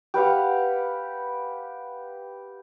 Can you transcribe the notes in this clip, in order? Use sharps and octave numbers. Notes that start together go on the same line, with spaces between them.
G4 B4 F5 F#5